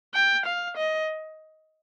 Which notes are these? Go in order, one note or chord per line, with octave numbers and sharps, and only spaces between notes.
G5
F5
D#5